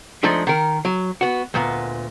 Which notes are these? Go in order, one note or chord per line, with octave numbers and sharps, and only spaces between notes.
F3 G#3 A3 D4 D#4
D#3 A#4
F#3
B3 F#4
D2 A#2 B3